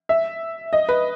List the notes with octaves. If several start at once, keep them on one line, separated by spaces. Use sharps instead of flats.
E5
D#5
B4